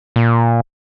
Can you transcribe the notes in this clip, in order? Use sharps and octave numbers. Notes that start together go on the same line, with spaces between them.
A#2